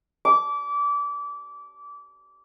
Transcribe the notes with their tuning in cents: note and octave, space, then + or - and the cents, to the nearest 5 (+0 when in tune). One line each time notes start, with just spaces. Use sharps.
D6 -25